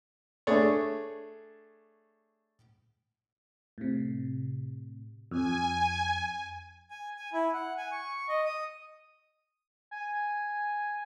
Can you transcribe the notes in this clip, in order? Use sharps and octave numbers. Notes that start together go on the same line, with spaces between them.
A3 D4 G#4 C#5
A2 C3
F2 G#5
G#5
G#5
E4
F#5
G#5
C#6
D#5
D#6
G#5